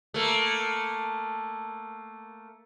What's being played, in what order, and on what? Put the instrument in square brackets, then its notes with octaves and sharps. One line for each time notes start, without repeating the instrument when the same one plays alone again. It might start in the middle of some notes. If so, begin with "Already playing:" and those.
[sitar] A3 A#3